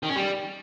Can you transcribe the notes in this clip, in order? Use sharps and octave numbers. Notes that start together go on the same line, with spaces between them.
D#3
C#4
G3